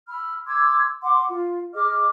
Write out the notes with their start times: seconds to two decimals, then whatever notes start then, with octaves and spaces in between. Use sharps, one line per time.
0.09 B5 E6 F6
0.47 C6 D6 E6 G#6
1.03 F#5 C6 D6
1.28 F4
1.74 G#4 D#5 D6 F6